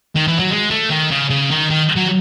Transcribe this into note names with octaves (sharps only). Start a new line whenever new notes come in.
D#3
E3
F#3
G#3
A3
D#3
C#3
C#3
D#3
D#3
F#3